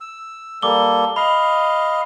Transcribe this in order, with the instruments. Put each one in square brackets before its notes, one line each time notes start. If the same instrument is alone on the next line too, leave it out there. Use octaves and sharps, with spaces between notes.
[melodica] E6
[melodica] G3 A#3 A4 [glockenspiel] D6 G7
[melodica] D#5 F5 [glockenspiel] B5